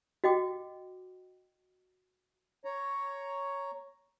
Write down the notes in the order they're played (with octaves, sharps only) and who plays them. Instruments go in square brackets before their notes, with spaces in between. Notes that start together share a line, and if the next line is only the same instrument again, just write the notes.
[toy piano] F#4 D#5 G5 D6
[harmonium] C#5 A#5